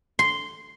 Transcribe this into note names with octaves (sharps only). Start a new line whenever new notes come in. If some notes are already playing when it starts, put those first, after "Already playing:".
C6